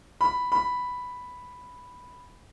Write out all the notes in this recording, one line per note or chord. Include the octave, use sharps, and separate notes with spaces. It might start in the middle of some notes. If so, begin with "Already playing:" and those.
B5
B5